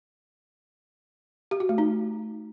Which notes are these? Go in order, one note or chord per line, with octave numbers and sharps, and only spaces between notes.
G4
F#4
A3
D#4